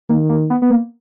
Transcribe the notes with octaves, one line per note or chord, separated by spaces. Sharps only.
D#3 A#3
A#3
B3
B3
A#3